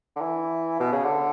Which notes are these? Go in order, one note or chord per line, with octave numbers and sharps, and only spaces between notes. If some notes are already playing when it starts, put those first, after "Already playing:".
D3
E3
B2
C#3
D3